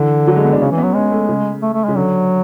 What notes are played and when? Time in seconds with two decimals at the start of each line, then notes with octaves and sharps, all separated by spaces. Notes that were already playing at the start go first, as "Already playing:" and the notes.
Already playing: D3 E3
0.27 F#3
0.36 G#3
0.44 B3
0.53 D4
0.61 C#3 C#4
0.72 E3
0.78 B3
0.83 F#3
0.94 G#3 C#4
1.11 A3
1.29 C#3
1.62 A3
1.73 A3
1.84 C#3 G#3
1.96 D3 F#3